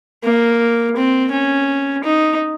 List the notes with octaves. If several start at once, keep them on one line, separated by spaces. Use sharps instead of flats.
A#3
C4
C#4
D#4